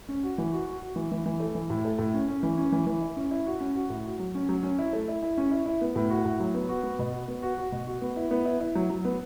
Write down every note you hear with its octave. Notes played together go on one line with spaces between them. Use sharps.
C#4
F#4
E3
F#4
F#4
F#4
E3
E3
E3
A3
E3
A2
A3
A2
C#4
C#4
E3
C#4
E3
E3
E4
C#4
E4
F#4
C#4
F#4
A2
F#4
F#3
C#4
F#3
C#4
E4
A3
E4
E4
C#4
E4
E4
B3
A2
F#4
A2
F#3
B3
F#4
B3
B2
F#4
B3
F#4
F#4
B2
F#4
B3
E4
B3
E4
E4
F#3
F#3
B3